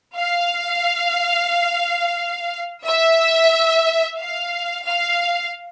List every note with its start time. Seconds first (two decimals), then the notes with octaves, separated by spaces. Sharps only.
0.17 F5
2.85 E5
4.19 F5
4.86 F5